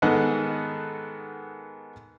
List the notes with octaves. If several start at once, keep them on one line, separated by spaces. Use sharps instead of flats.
G#2 D#3 B3 A4 D#5 F#5